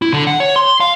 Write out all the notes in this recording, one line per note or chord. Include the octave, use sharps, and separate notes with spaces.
E4
D3
F#5
C#5
C6
F5